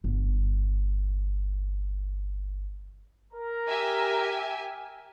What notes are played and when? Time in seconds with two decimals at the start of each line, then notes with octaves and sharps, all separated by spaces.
0.04 G1 E2
3.33 A#4 A#5
3.67 G4 E5 G#5